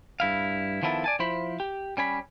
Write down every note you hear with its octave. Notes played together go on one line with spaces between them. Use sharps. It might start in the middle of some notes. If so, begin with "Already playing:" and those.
G2 E4 F5
D#3 F3 B3 E4 A4
D5 G#5 A5
F3 E4 C5 B5
G4
G3 C#4 G#5 B5